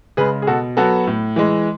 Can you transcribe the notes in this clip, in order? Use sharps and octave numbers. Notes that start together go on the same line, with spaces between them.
C#3 G#3 G#4 B4
G#4
B2 F#4 A4
F#3 B3 F#4 A4
A2
E3 G#3